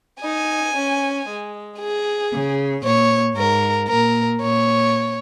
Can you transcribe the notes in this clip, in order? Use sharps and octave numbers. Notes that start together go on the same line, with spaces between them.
D#4 G#5
C#4
G#3
G#4
C#3
A#2 C#5
G#2 A#4
A#2 A#4
A#2 C#5